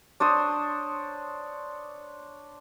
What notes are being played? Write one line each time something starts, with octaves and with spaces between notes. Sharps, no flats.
D4 C5 C#5 D#6